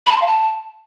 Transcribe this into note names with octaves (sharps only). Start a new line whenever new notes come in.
B5
A5
C6
F5
A5